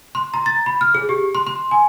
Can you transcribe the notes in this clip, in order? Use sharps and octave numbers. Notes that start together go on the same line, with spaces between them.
C6
A#5
A6
B5
F6
G#4
G4
C6
C6
G#5